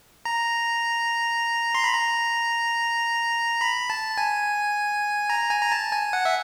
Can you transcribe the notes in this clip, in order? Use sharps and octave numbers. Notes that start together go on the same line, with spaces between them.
A#5
C6
B5
A#5
B5
A5
G#5
A#5
G#5
A#5
A5
G#5
F#5
E5